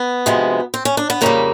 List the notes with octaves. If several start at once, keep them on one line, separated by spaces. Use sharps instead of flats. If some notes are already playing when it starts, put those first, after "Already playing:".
Already playing: B3
D2 C3 F3 G#3
C4
C#4
D4
B3
F2 C#3 E3 G3 A#3